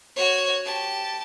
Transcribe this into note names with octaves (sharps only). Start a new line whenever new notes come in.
F#4 C#5
G4 A5